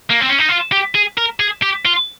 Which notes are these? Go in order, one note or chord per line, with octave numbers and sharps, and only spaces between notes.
A#3
C4
C#4
D#4
F4
G4
G#4
A#4
G#4
G4
F4